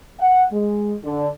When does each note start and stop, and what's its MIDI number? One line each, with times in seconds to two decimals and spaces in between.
0.19 0.44 78
0.51 0.94 56
1.03 1.28 50